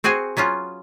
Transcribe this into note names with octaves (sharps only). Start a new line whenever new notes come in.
C4 F#4 G#4 C5 G#5
F#3 B3 C#4 F4